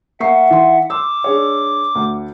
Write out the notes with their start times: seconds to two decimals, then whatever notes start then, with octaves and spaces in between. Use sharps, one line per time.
0.20 A#3 E5 F#5 C#6 C7
0.51 E3 C6
0.90 C6 D6 E6
1.24 D4 G#4 C#5
1.95 D2